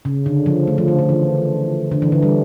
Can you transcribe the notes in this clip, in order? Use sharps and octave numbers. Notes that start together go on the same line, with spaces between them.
C#3
D3
F3
A3
F3
D3
D3
E3
D3
E3
D3
G3